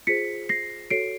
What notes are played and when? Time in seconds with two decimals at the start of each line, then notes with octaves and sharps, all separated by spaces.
0.07 F4 G#4 C5 B6 C#7
0.49 A#6 C7
0.90 F#4 A4 C#5 C7 D7